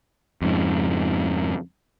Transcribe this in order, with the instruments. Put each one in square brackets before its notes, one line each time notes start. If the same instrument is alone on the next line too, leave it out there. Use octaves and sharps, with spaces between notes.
[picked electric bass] F2 G#2 C#3